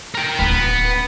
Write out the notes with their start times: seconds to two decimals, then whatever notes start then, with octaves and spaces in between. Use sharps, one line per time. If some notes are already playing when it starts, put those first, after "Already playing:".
0.15 A#4 G5
0.39 D1 B3 C#4